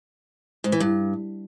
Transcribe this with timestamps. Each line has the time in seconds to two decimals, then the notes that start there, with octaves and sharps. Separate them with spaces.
0.64 G#2
0.72 E3
0.80 G2